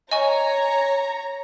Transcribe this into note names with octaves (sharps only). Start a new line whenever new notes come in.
C#5 D#5 G#5 A#5 C#6